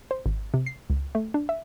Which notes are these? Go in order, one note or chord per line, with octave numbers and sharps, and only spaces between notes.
C5
G#1
C3
C7
C#2
A3
D4
E5